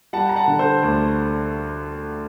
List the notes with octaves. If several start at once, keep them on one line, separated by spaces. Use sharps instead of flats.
G3 F#5 A5
A#5
F#5 A5
D3
A4 C5
D2